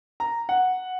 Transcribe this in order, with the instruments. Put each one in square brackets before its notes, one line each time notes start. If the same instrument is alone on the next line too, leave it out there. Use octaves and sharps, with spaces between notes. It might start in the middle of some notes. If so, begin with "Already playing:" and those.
[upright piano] A#5
F#5